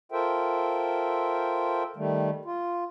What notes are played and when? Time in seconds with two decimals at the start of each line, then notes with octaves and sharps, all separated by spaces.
0.12 F4 A4 A#4 C5 E5 G5
1.96 D#3 G3 A3
2.45 F4